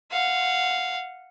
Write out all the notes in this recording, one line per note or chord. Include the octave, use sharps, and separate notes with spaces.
F5 F#5